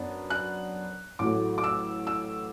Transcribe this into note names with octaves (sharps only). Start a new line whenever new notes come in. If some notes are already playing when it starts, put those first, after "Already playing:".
Already playing: F#2 F#3 B3 D4
F#6
A1 A2 F#3 A3 D6
D6
E6
E6